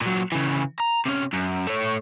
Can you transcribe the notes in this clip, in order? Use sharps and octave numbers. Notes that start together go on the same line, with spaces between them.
A#2 F#3
C#3 E3
A#5
C3 C#4
F#2
A3 C#5